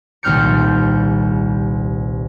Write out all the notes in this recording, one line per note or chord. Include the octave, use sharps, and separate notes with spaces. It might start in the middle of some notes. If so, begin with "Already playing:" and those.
D#1 C2 C4 F6 G6 C#7